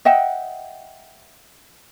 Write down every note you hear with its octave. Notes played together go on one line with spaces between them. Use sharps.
D#5 E5 F#5 G5